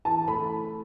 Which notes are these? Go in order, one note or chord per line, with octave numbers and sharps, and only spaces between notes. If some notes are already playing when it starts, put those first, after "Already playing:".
E3 A5
A3 B5